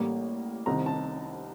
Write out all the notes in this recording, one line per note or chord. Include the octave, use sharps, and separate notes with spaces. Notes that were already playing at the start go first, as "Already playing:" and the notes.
Already playing: A1 A2 G3 A#3
C2 C3 D#3 A#5
A5